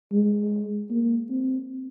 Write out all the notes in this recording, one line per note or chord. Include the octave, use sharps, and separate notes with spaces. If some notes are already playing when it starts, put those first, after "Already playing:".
G#3
A#3
C4